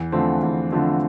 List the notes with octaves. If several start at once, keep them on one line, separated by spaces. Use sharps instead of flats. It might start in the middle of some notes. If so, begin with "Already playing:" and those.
Already playing: E2
D3 F3 A3 C4
E2
D3 F3 A3 C4